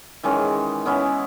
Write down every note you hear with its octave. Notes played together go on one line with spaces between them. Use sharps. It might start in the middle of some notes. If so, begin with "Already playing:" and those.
D#3 E3 G#3 C#4
B3 C#4 E4